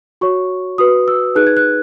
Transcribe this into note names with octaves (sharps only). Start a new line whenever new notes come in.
F#4 C#5 C#6
F#4 B4 D#6
E6
D#4 G#4 B4 F#6
G#6
F#6